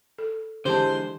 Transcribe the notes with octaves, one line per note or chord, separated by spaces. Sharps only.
A4
D3 E3 G#3 G4 C5 A5